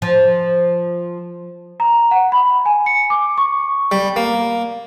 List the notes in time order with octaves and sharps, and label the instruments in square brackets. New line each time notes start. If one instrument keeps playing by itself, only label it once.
[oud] F3
[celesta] A#5
F#5
B5
G#5
C#7
D6
C#6
[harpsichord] G3
A#3